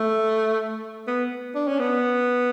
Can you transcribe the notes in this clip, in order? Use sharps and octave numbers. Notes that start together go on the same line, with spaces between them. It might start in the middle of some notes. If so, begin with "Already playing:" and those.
Already playing: A3
B3
D4
C#4
B3